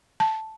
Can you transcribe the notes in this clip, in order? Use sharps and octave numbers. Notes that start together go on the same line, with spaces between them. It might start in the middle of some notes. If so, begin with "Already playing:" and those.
A5